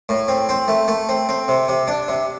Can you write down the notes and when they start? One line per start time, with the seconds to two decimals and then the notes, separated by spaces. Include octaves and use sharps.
0.09 A2
0.28 C4
0.49 C4
0.68 A3
0.88 A3
1.09 C4
1.29 C4
1.48 C3
1.68 C3
1.88 D4
2.08 C3